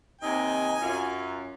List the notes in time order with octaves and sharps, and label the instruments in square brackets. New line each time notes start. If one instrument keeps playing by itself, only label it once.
[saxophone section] D#2 C3 D#4 [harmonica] G#5
[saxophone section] F#2 F4